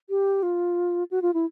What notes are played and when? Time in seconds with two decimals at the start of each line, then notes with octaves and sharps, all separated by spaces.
0.10 G4
0.43 F4
1.11 F#4
1.22 F4
1.34 E4